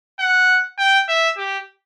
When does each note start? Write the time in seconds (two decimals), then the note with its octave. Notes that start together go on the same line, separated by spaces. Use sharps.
0.20 F#5
0.79 G5
1.08 E5
1.37 G4